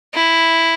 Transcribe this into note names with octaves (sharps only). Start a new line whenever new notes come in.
E4